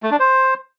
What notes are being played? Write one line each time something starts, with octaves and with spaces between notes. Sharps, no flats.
A3
D4
C5